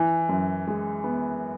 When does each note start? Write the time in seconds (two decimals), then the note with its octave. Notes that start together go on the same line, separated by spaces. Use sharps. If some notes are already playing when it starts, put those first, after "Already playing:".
Already playing: E3
0.29 F#2
0.67 G#3
1.04 B3